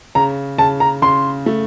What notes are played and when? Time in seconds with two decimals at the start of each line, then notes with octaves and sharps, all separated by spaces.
0.15 C#3 A#5
0.58 C#3 A5
0.80 A#5
1.02 C#3 C6
1.46 A3